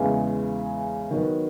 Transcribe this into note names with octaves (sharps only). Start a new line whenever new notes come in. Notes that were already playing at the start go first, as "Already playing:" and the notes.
Already playing: E2 C#3 E3 G#3
D#3 F#3 B3